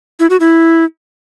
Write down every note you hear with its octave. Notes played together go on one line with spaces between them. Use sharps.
E4
F#4
E4